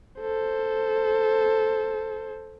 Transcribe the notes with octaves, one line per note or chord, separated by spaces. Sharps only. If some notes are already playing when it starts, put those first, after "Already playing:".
A4 C5